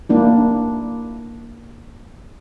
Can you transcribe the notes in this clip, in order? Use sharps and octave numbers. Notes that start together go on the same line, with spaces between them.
A#3 D4 E4